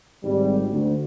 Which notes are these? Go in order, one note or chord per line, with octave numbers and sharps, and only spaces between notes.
G#1 G3
D2